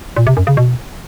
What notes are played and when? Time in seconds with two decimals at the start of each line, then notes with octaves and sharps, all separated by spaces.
0.17 A#2
0.27 C3
0.37 F#2
0.47 C#3
0.57 B2